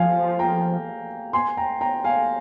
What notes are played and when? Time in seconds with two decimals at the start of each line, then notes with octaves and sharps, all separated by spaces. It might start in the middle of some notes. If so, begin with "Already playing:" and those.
Already playing: F3 F5 G#5
0.39 G5 A#5
1.33 G#5 C6
1.57 G5 A#5
1.81 G5 A#5
2.04 F5 G#5